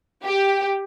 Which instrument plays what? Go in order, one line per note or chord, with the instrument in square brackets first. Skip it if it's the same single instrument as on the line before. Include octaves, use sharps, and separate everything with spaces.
[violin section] G4